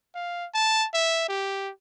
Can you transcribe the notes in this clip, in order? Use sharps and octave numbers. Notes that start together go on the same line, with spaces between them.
F5
A5
E5
G4